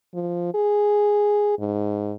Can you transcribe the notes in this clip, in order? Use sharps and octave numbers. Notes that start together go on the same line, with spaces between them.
F3
G#4
G#2